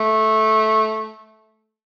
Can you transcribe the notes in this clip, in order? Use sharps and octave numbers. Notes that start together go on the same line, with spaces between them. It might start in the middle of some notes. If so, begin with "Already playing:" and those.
Already playing: A3